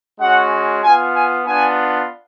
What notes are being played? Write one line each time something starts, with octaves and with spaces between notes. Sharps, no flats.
G#3 C#4 F#4 F#5
B3 F4 G#5
G#5
B3 D4 F4 G#5